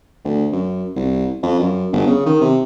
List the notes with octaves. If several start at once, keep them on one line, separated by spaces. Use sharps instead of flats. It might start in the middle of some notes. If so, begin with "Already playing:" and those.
D2
F#2
C2
F2
F#2
G1
C#3
D#3
C3